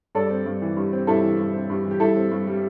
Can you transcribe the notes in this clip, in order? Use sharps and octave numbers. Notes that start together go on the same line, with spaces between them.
G2 A4 D5
C4
G2
E3
G2
C4
G2 E4 A4
E3
G2
C4
G2
E3
G4
G2 E4 A4
C4
G2
G3